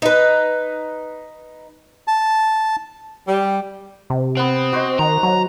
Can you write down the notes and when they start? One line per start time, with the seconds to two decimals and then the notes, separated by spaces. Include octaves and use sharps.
0.02 D#4 B4
2.08 A5
3.28 G3
4.10 C3
4.37 B3 C4 F#5
4.73 F#4 C5 D#5
4.99 D#3 A#5
5.23 F#3